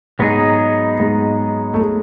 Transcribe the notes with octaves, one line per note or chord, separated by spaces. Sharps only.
G#2 F#3 G#3 B3 D#4 G#4
G#2 G#3
A3
G#3